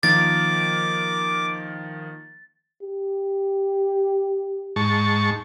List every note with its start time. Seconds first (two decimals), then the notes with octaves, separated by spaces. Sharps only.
0.03 D#3 F3 A#3 D6 A6
2.82 G4
4.76 G#2 A5 C#6